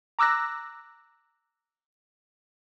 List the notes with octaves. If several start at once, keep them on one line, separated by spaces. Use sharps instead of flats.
A#5 D6 E6 F#6 A#6